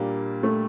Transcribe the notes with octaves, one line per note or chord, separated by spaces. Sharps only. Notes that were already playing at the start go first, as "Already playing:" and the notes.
Already playing: A#2 G3 A#3 D4
A3